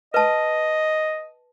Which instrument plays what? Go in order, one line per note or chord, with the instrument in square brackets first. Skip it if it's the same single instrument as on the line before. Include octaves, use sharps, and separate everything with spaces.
[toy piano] B4 A5 [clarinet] D#5